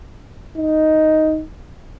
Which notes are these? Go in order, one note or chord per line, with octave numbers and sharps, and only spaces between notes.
D#4